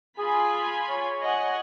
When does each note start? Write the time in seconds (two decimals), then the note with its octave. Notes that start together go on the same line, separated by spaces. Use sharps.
0.19 F4 G#4 G#5 B5
0.89 C#5
1.23 D#5 F#5 G#5